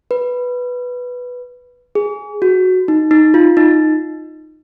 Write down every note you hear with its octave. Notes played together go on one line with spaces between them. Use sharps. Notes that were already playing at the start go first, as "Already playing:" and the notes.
B4
G#4
F#4
D#4
D#4
F4
D#4